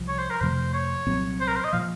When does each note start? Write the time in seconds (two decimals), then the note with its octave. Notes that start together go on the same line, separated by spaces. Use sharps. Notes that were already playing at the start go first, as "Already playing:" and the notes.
Already playing: C2 C3 F3
0.08 C#5
0.19 C5
0.30 A#4
0.41 F2 C3 F3 A3 C5
0.74 C#5
1.06 C2 A#2 F#3 C4
1.40 C5
1.47 A#4
1.56 C5
1.64 D#5
1.73 A#2 F3 F5